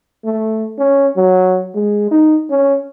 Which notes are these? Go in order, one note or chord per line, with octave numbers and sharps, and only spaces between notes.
A3
C#4
F#3
G#3
D#4
C#4